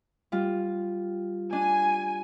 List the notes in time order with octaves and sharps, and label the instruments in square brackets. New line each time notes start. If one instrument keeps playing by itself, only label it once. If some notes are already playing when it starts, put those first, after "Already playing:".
[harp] G3 F4
[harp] D4 [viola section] G#5